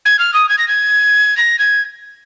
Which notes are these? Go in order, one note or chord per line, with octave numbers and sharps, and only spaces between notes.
G#6
F6
D#6
G#6
A#6
G#6
A#6
G#6